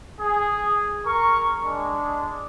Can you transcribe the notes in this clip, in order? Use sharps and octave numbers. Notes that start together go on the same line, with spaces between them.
G#4
A#4 C#6
G#3 D4